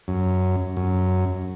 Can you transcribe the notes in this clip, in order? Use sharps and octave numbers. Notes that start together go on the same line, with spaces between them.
F#2
F#2